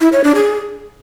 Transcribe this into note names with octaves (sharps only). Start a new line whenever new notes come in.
E4
C#5
D4
G#4